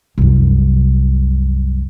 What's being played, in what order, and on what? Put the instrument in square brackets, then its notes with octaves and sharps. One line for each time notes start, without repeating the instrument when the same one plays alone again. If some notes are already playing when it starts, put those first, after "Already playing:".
[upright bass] C2 F#2